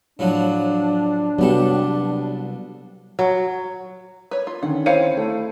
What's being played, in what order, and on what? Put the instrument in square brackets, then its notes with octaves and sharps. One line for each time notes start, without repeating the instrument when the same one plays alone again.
[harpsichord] A2 F3 F#3 [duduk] D4
[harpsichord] C2 G3 A4 [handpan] F#3 B3 G4
[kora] F#3
[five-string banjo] B4 C#5
F4
[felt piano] D3 D#3 C#4 [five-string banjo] F#5
[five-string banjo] C4 F5 G5 [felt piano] E4 C#7 D#7 [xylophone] C5 C#5
[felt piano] A3 E4